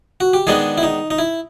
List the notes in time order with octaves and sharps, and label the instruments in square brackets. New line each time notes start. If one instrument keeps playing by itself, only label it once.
[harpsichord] F#4
G4
D#3 G#3 B3 D4 G#4
E4
D#4
D#4
E4